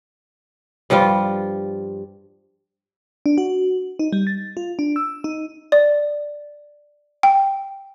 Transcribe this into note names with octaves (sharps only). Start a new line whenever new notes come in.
G2 F3 G3 F4
D4
F#4
D#4
G3
A6
F4
D4
E6
D#4
D5
G5